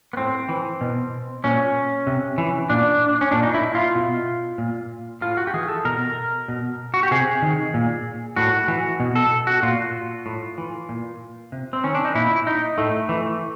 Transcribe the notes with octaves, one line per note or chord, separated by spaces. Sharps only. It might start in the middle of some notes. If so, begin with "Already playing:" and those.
B3
A2 C4
E3
B2
A#2 C#4
C3
E3
A#2 D4
C#4
A#2 D4
D#4
E4
F4
B2
A#2
A2 F4
F#4
G4
E3 G#4
A4
B2 A#4
B2
F#4
G4
C3 G#4
D#3
A#2
A2 F#4
E3
B2
A4
F#4
A#2 F4
A2
E3
A#2
C3
C4
D#3 C#4
D4
D#4
A#2 E4
D#4
A2 A3
E3